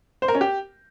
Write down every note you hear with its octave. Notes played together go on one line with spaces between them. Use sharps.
C5
A#4
C#4
G4